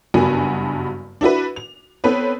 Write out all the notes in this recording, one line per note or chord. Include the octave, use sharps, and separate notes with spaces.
F#1 G2 B3 F#4 G#5
D4 E4 F#4 B4
F7
B3 C4 A4 B4 C#5